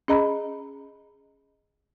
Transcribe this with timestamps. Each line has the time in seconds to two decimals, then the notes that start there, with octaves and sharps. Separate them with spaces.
0.08 C#4 G#4 D#5 A#5 B5